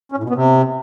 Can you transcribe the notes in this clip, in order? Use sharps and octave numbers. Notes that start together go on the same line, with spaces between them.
C#4
A2
B2
B3
C3